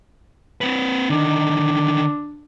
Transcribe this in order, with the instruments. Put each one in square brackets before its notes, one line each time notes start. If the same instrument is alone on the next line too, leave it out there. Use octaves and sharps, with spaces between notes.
[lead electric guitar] C4 B4
[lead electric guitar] D3 D#3 [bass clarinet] D4